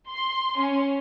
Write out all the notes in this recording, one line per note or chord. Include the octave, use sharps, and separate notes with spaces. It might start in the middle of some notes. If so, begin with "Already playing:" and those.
C6
C#4